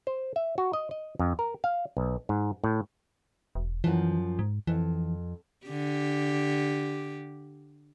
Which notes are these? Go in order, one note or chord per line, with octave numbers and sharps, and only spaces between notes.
C5
E5
F#4
D#5
D#5
F2
A#4
F5
B1
G#2
A2
E1
F#2 E3 F3
G#2
F2 E3
D3 G4